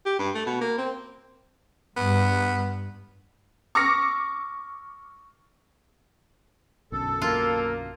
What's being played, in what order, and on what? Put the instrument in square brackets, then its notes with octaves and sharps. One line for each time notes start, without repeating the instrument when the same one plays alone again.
[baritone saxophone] G4
G2
A3
B2
A#3
C4
[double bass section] G2 [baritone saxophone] B3
[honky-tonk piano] C#6 D6 E6 F6 A#6 C#7
[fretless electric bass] B1 F#2 D3 [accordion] A4
[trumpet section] A#3 [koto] F4